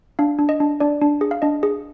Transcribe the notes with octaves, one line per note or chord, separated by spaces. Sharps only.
D4 F5
D4
D#5
D4
D4 D5
D4
G#4
F5
D4 D#5
G#4